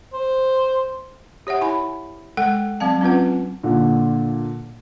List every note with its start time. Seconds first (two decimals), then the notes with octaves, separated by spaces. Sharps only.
0.13 C5
1.47 G4 C#5 E5 F#5
1.61 E4 G#5 B5
2.37 G#3 A4 F#5 G5
2.80 F#3 C4 F5 A5
3.01 C4 C#4 F4 B4 F#5
3.63 A#2 D3